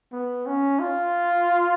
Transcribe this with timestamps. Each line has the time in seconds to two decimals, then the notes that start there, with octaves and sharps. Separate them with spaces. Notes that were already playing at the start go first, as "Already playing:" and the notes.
0.12 B3
0.46 C#4
0.79 F4